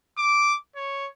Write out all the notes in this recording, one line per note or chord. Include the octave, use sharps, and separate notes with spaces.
D6
C#5